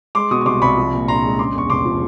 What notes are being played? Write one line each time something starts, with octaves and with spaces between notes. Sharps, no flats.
G#3 C6 D6
B2 C#6 D#6
C#6
C2 C6 D6
C2 B5 C#6
F3
A#2
A#1 A#5 C6
G#3
C#3 C6 D6
E2 C#6
F1 C6 D6
F3